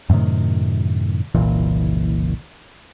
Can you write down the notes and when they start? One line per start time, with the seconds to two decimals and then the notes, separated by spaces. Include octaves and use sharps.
0.09 F#2 A2 C3 D#3
1.35 F#1 C2 A#2 E3